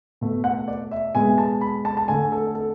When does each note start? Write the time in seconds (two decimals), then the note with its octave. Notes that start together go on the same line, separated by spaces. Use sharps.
0.21 B2 A3
0.44 F#5
0.68 D5
0.91 E5
1.15 B2 G#3 B3 G#5
1.38 A5
1.61 B5
1.85 A5
1.97 A5
2.08 D3 A3 G#5
2.32 A4
2.55 A4